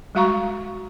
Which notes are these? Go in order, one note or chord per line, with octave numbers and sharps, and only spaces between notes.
G3 G#3 F#4 F5 A#5 C#6